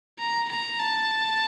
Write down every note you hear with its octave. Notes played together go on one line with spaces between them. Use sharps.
A#5
A#5
A5